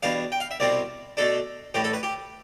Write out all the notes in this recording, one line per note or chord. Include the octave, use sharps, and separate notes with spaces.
E2 B2 G3 D4 F5
G5
F5
E5
C2 B2 G3 C4 D5
B2 A3 D4 A4
A1 A2 G3 G4
A4
B4
G4